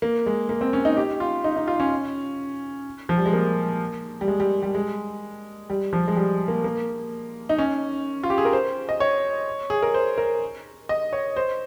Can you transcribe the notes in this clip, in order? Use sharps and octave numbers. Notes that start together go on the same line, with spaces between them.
A#3
G#3
A#3
C4
C#4
D#4
G4
F4
D#4
D#4
F4
C#4
F3
G3
G#3
A#3
G3
G#3
G3
G3
G#3
G3
F3
G#3
G3
A#3
A#3
D#4
C#4
F4
G4
G#4
A#4
C5
D#5
C#5
G#4
A#4
C5
A#4
D#5
C#5
C5